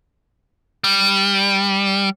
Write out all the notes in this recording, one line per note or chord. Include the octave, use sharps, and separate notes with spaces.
G3